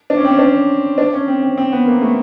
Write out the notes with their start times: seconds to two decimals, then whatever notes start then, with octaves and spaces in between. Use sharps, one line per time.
0.10 D4
0.17 C#4
0.25 C4
0.32 C#4
0.38 D4
0.98 D4
1.13 C#4
1.28 C4
1.42 C4
1.57 C4
1.72 B3
1.87 A#3
2.02 A3